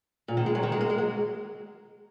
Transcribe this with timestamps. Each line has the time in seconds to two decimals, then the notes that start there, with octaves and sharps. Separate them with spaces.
0.28 A#2
0.37 D#3
0.46 G#3
0.55 F#3
0.63 D#3
0.72 G#3
0.81 A#3
0.90 G#3
0.98 F#3